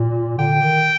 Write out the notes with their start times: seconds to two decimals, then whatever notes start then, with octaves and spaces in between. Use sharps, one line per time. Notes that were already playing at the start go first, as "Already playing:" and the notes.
Already playing: A#2
0.38 D3 G5
0.54 D3
0.62 D#3